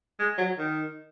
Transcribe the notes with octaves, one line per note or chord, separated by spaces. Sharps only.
G#3
F#3
D#3